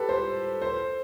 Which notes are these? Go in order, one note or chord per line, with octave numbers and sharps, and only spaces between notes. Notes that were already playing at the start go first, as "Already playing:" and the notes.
Already playing: G4 A4 B4
C5
C5